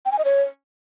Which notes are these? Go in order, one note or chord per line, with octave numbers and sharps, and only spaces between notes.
G5
G#5
D#5
C#5